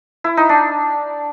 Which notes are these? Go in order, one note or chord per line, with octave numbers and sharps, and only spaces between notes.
E4
D#4
D4